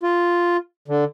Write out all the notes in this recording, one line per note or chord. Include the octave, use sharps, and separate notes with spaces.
F4
D3